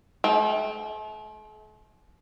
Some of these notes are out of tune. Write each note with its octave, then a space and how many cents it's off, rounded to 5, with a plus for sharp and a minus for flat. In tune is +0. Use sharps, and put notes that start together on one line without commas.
A3 -45 G5 +0